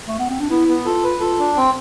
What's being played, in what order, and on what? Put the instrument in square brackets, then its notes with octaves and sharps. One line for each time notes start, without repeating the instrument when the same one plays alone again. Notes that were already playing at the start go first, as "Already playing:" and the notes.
[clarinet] A3
B3
C4
D4
[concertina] B3 [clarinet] E4
[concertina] B3
[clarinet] F4 [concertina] A4
[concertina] B4
[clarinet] F4 [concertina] A4
[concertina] D4
C4